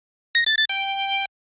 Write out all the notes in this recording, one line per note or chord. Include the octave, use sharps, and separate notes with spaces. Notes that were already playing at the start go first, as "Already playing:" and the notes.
A#6
A6
A6
G5